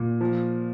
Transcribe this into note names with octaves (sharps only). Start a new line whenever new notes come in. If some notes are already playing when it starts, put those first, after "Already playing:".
Already playing: A#2
F3